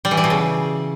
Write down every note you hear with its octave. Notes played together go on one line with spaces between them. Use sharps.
G3
E3
G3
B2
C#3